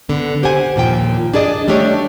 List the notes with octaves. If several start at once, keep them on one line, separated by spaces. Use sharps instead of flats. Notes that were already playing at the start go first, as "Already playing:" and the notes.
D3 B3
G4 C5 F#5 G#5
D#2 A#2 F3 G5
D4 G#4 D5 D#5
G3 A3 D4 G4 C#5